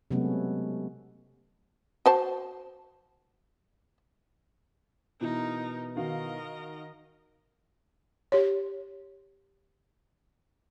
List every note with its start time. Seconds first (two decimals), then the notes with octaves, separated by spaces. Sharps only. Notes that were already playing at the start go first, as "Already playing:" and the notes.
0.11 C3 F#3 G#3 A3 B3 C#4
2.06 F#4 C5 A5
5.21 B2 E3 D#4 A#4
5.96 D#3 F#4 A#4 D#5 F5
8.32 G4 C#5